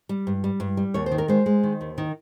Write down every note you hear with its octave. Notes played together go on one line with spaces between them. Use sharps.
G3
G2
G3
G2
G3
D#2 C#5
C5
D#3
A#4
G#3 C5
G#3
D#3
D#2
D#3